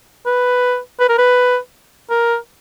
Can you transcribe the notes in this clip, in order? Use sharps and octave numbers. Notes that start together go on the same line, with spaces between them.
B4
B4
A#4
B4
A#4